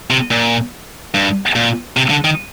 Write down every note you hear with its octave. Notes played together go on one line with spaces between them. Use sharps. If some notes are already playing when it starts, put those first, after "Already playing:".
C3
A#2
G2
A#2
C3
D3
D#3